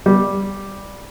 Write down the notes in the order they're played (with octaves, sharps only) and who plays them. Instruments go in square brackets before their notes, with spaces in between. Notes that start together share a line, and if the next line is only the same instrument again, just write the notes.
[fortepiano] G3